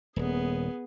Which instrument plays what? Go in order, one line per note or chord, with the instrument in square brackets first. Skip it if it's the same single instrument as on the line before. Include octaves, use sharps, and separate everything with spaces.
[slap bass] D#1 [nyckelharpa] B3 G#4